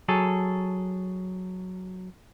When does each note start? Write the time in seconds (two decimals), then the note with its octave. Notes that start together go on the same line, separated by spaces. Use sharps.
0.09 F#3 G#4 A4